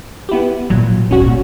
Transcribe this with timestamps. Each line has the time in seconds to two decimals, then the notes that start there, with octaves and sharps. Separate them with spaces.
0.29 B3 E4 G4
0.70 A#2 F#3
1.11 G2 C#4 F#4
1.21 A#2